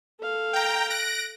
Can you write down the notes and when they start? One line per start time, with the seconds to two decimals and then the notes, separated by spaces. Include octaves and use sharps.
0.20 A4 F5
0.53 G5 A#5
0.90 F#6 A#6 D7